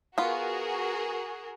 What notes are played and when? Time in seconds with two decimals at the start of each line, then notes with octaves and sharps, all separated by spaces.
0.18 B3 F4 F#4 G#4 A#4